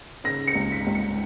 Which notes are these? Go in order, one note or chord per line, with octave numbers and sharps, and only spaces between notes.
C#3 A#6
C#7
C#2
B6
C#2
C#7